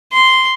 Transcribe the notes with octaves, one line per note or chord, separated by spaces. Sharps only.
C6